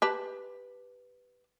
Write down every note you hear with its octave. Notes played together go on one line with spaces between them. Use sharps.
G4 B4 A5